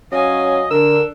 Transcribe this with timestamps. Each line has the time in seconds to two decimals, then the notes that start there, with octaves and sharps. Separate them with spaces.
0.12 F#3 C#4 D#5 F5 G#5
0.71 D3 D4 A4 A#4 E6